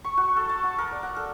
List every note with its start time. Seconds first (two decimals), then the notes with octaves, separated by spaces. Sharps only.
0.04 C#6
0.17 F#4
0.36 A4
0.49 A5
0.63 F#5
0.78 A#4
0.91 D5
1.03 F#5
1.16 A4